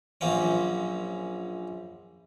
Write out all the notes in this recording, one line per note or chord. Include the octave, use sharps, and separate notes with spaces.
A#1 F#2 A#3 C4 C#4